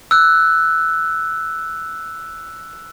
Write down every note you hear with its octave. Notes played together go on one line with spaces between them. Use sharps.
E6 F#6